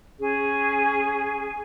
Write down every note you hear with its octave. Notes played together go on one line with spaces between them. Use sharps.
C#4 G#4